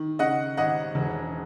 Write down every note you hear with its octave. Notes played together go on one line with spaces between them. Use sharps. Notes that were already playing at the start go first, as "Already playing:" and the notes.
Already playing: D#3
C#3 D#5 F#5
G#1 D#5 F#5
E1